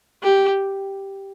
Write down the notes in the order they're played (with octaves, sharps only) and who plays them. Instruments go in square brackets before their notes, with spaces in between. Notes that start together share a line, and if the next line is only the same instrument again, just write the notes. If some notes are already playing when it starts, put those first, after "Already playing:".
[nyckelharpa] G4